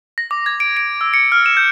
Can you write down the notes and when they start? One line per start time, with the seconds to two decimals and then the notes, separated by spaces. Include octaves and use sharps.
0.18 A#6
0.31 D6
0.46 G#6
0.60 D7
0.77 D7
1.01 E6
1.14 C#7
1.32 F6
1.46 E7
1.57 G6